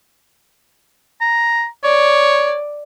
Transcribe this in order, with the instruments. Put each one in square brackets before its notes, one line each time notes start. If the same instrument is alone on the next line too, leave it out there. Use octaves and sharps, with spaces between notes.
[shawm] A#5
[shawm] C#5 [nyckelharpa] D5